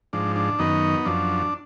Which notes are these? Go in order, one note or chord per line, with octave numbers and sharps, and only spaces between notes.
G#2 F3 D4
D4
F#2 D#3 B3 D#4
F#2 F3 D4